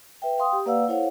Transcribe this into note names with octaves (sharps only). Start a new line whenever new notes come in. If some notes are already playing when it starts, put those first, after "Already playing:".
B4 E5 G5
F5 G5 C6 D#6
G4
A#3 B4 D5 F5 F#5 E6
E4 A4 C5 C#5 F5 F#5